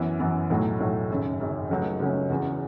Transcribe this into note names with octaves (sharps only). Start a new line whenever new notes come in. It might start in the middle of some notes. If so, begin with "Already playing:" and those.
Already playing: F#2 E3 B3
F#2 E3 B3
B1 A2 F#3 A3
B1 A2 F#3 A3
G#1 F#2 C#3
G#1 F#2 C#3
C#2 C#3 F#3 A3 C#4
C#2 C#3 F#3 A3 C#4
E2 C#3 F#3 C#4